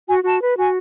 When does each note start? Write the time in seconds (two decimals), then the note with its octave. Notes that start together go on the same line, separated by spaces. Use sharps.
0.08 F#4 G#5
0.24 F#4 A5
0.41 B4
0.58 F#4 G#5